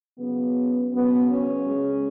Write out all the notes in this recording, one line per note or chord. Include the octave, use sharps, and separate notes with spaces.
C#3 F#3 B3
C#3 F#3 B3
C#4
C#3 G#3